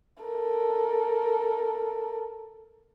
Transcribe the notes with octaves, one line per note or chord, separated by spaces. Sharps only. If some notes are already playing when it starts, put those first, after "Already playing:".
A4 A#4